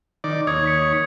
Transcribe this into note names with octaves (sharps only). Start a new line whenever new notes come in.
D#3 D5
D#2 C#5 D#6 G#6
B6 C#7